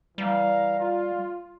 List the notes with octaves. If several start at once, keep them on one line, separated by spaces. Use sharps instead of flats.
E3 G3 F5 A#5
F4